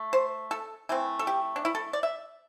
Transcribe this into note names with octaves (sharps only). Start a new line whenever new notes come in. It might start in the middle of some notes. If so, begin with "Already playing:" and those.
Already playing: A3
C5
A4
E3 A3 C4
A4
G4
D4
E4
A4
D5
E5